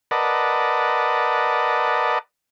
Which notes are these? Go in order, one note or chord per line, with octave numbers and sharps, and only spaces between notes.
A#4 B4 D5 D#5 F#5 A5